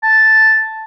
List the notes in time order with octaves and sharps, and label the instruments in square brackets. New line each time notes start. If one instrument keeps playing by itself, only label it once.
[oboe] A5